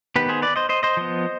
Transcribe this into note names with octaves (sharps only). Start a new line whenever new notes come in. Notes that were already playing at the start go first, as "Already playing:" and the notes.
D#3 B3 G4 B4
G#4 C5
B4 D5
C5 D#5
C5 D#5
C5 D#5
F3 B3